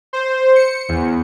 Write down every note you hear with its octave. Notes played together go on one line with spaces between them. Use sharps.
C5
C#7
E2